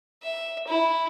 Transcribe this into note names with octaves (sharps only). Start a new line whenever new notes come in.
E5
E4